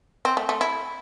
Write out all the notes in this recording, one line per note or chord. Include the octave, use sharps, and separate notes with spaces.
C4
A3
A3
E4